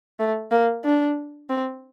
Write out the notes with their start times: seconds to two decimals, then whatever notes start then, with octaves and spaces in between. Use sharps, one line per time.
0.20 A3
0.51 A#3
0.85 D4
1.50 C4